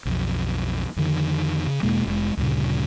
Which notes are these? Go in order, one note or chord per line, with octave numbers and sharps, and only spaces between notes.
B1 F2
F2 D3 D#3
C#3
E2 B2 G#3 A#3
F1 G#3
D2 G2 A#2 C#3